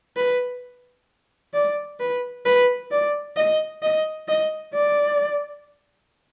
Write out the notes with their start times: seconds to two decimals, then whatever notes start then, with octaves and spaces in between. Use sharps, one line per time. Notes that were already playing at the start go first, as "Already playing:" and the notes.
0.16 B4
1.54 D5
1.99 B4
2.45 B4
2.91 D5
3.37 D#5
3.82 D#5
4.28 D#5
4.74 D5